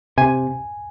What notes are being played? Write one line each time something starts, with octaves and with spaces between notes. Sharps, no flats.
C3 G#5